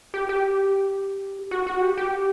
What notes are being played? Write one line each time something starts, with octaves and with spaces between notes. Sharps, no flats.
G4
G4
F#4
F#4
G4
G4